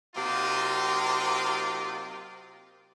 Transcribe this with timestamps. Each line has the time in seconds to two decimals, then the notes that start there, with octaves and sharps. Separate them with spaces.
0.16 C3 F#3 A#3 C4 D#4 F4